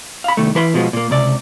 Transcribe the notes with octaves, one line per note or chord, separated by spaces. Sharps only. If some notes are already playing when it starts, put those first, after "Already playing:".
F5 B5
C2 D#3 A3
E3 B4 C6
B2 F3 G#3 B3
A#2 A#3
C#2 C3 D5